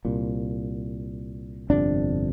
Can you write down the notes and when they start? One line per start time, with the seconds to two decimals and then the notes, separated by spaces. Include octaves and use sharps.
0.05 C2 A#2
1.70 G1 F2 C3 D4